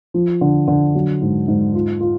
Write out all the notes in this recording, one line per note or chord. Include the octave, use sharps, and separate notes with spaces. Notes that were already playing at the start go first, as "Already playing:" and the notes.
F3
D3
D3
F#3
G#2
G#2
F4
F4